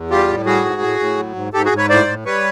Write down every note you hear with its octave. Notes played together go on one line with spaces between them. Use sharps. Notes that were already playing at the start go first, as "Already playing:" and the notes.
Already playing: E2
G3 F4 G4
A2
G3 F#4 G#4
G#2
A2
A2
F#3
G#2
G#2 G4 A4
F#4 G#4
G#2
B4 C#5
A2 C5 D5
A2
G3 B4 C#5